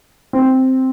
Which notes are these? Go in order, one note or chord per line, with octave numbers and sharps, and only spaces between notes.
C4